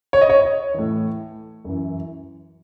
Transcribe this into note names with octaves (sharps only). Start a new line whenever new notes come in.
C#5
D#5
C#5
A2 E3
F#2 E3